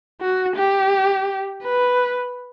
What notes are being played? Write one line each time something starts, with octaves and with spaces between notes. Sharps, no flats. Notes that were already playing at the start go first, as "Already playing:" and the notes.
F#4
G4
B4